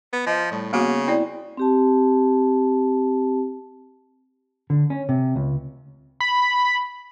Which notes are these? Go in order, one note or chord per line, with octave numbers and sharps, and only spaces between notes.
B3
F3 D#5
A2 G3
C#3 A#3 B3 F#4
C4 E4 D5
C4 G4 A5
D3
C#4
C3
C#2
B5